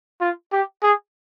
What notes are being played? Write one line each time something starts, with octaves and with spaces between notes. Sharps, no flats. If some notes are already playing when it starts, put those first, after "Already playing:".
F4
G4
G#4